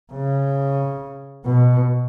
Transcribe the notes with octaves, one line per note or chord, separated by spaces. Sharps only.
C#3
B2